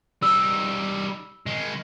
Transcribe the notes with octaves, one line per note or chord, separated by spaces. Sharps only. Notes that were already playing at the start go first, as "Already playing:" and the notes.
G3 D#4 E6
D#3 G#3